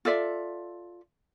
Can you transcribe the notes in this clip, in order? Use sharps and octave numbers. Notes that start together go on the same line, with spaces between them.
F4 A4 D5 E5